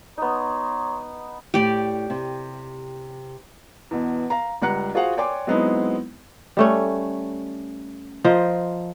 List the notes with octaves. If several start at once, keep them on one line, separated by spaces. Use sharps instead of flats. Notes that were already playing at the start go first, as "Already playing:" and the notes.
B3 D#4 C#5 A#5 C6
A2 G4 D5
C3
E2 B2
F5 A#5
C#2 G3 F#5 A#5 F#6 C#7
F4 F#4 G#4 C5 F5 F#5
C#5 D5 G5 G#5 C6 D6
F#3 G#3 B3 C4 D#4 E4
G3 A3 C#4
F3 A#4 C5 D#5